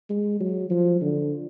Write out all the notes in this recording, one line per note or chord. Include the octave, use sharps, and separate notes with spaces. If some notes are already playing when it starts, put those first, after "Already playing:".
G#3
F#3
F3
D3